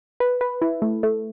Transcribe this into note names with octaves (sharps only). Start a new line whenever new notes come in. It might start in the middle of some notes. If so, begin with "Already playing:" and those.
B4
B4
E4
A3
A3